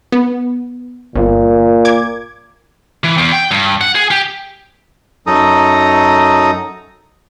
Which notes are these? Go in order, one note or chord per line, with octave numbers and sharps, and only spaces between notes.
B3
G1 A#2
D6 G#6
E3
E2
G5
G2
F#5
G#4
G4
F#2 F#3 D#4 A4 A#5 D#6